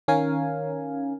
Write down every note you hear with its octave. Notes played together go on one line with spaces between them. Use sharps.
D#3 C#4 A#4 F5 G#5